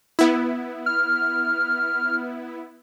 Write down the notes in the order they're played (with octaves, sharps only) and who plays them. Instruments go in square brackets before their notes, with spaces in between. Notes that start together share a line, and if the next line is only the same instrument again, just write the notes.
[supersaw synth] B3 E4
[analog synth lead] F6